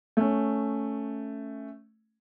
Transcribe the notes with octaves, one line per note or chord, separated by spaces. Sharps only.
A3 C#4